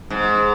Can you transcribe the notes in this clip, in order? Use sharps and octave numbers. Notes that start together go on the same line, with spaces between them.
G#2